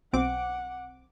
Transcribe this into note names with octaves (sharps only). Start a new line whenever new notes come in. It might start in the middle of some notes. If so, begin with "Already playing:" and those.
B1 C4 F#5 D6